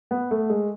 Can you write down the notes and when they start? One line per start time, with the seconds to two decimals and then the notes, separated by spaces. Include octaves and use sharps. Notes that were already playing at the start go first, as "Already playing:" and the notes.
0.11 B3
0.31 A3
0.50 G#3